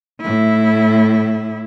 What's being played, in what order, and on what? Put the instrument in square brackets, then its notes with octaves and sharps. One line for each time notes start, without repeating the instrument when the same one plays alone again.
[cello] A2 E4